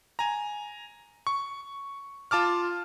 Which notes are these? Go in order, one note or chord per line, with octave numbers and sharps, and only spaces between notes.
G#5 A#5
C#6
F4 A5 D6 F6